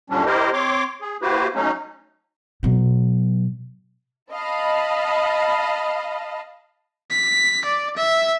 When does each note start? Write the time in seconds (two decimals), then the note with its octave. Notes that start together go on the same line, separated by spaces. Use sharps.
0.10 F#2 A#2 D3 G3 C#4 D4
0.26 E4 G4 A#4 C5 D#5
0.53 C4 C#5 C6 D6
1.01 G#4
1.22 A#3 E4 F#4 G4 B4 C5
1.55 F#3 A3 C#4 D#4
2.63 B2 F#3
4.32 D#5 F5 A5 B5
7.11 B6
7.65 D5
7.96 E5